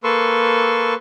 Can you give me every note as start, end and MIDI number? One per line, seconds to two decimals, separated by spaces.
0.04 0.94 58
0.04 0.94 69
0.04 0.94 71
0.04 0.94 84
0.04 0.94 85
0.04 0.94 88